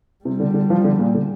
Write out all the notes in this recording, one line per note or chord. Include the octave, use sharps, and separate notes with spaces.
C3 G3
D3
D3
F3
D3
A#2
D3